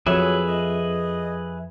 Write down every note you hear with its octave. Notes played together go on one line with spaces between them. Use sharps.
F2 F#3 G#4 B4 E5
D#5